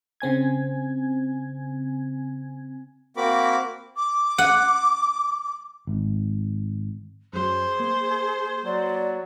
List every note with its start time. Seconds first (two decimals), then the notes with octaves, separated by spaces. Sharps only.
0.20 C#3 C4 G#5 G#6
3.17 A#3 C4 F#4 A#4 B5 D6
3.96 D6
4.38 F#5
5.87 G#1
7.33 F#2 F#3 G#4 C5
7.80 A#3
8.65 F#3 D5